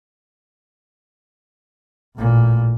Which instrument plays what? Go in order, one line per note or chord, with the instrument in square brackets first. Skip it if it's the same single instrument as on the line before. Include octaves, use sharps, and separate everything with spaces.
[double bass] A1 A#2